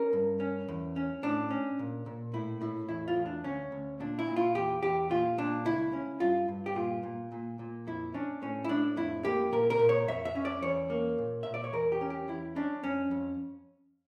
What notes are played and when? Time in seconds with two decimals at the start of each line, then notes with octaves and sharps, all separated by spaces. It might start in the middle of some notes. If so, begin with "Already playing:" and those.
Already playing: C#4 A#4
0.13 G2
0.40 C#4
0.68 E2
0.96 C#4
1.23 A2 D4
1.50 C#4
1.79 A#2
2.06 A#2
2.33 A2 E4
2.61 A2 E4
2.89 E2 E4
3.08 F4
3.17 E2
3.26 D4
3.44 D2 C#4
3.72 D2
4.00 A#2 D4
4.19 E4
4.27 A#2
4.36 F4
4.55 E2 G4
4.83 E2 G4
5.10 A#2 F4
5.38 A#2 D4
5.65 C#2 E4
5.93 C#4
6.20 G2 F4
6.48 G2
6.66 G4
6.75 A#2 F4
7.03 A#2
7.32 A#2
7.59 A#2
7.87 F2 E4
8.14 C#4 D4
8.42 A2 C#4
8.64 E4
8.69 A2 D4
8.96 F2 E4
9.24 A#3 G4
9.52 A#2 A#4
9.70 A#4
9.79 A#2
9.89 C#5
10.08 F2 E5
10.25 E5
10.35 C#4
10.45 D5
10.63 E2 C#5
10.90 A#3
11.18 A#2
11.43 A#2 E5
11.54 D5
11.64 C#5
11.73 E2 A#4
11.92 G4
12.01 C#4
12.10 G4
12.28 E2 E4
12.56 C#4 D4
12.84 F2 C#4
13.11 F2